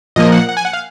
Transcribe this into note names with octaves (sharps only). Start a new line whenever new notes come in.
A#2 F3 A#3 D#5
F#5
F#5
G#5
F#5
F5